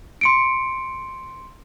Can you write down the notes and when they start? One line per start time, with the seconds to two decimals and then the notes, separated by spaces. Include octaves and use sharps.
0.21 C6 C#7 D7